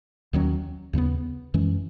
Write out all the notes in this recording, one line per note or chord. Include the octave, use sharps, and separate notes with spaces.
D#2 D#3 F#3 C#4
D#2 C#3 G#3 B3
F#2 E3 G#3 C#4